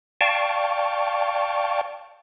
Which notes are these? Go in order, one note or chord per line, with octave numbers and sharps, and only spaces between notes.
D5 F5 G5 A5 C#6